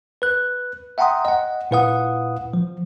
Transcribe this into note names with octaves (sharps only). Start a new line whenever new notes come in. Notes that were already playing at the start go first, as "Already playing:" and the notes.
B4 F#6
E5 F#5 G5 A#5 C6 D#6
D#5 F#5
A#2 E4 B4 F5 F#5 D#6
F3